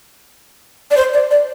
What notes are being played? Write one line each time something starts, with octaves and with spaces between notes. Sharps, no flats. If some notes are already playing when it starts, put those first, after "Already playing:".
D5
C5
D5
D5